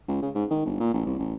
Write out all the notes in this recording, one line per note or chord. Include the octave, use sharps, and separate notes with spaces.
C#2
C#3
G#2
D#3
G1
A#2
A1
C2
A1